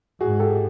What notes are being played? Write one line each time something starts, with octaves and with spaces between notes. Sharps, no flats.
G#2 F#4 G#4
G4 A4